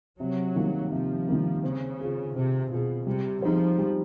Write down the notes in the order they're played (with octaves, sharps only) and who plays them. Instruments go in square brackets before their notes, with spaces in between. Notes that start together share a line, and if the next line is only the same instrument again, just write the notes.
[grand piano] C3 [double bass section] F#3
[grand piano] D#3 G3 A#3
[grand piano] C3 [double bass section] F3
[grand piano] D#3 G3 A#3
[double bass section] C#3 [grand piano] C4
[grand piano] F4 G#4
[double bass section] C3 [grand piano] C4
[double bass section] B2 [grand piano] F4 G#4
[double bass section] C3 [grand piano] G3
[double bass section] F3 [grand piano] C4 D#4 G#4 C5
[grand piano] G3